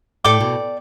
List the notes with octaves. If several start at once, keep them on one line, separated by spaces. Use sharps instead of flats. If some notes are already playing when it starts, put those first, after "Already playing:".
A2 A4 D5 G5 D6
B2